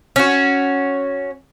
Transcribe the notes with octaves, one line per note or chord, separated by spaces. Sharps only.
C#4 F#4